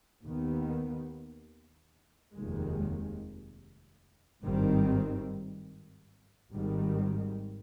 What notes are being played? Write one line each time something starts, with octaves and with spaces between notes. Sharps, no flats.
D#2 D#3 B3
F1 D#2 D#3 G#3
G#1 G2 D#3 G3 C4
G#1 G#2 D#3 G3